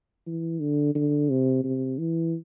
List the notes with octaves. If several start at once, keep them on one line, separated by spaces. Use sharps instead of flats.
E3
D3
D3
C3
C3
E3